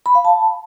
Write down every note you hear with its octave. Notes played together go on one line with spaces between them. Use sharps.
B5
F5
A5